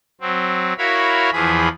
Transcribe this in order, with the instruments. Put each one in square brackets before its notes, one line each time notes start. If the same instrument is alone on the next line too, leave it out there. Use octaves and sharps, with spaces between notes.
[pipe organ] F#3 C4
E4 F#4 A#4 C#5 F5 B5
E2 E3 F3 G#4 B5